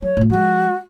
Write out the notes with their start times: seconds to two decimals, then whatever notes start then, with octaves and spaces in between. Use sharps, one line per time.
0.02 F#3 C#5
0.17 A2 F4
0.30 F3 G#3 F#4